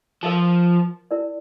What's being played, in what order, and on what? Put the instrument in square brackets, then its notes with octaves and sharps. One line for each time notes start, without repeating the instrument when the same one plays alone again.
[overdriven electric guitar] F3 [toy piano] A#4 F5 A5
[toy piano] E4 A#4 D5